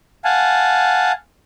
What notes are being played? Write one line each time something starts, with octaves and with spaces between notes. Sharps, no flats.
F5 F#5 G#5 A5